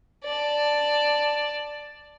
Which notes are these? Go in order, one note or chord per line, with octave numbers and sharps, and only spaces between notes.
D5 A5